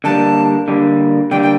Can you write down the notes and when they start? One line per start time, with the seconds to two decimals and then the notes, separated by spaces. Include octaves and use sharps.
0.04 D3 G3 A#3 A5
0.68 D3 G3 A#3
1.31 D3 G3 A#3 G5
1.43 G5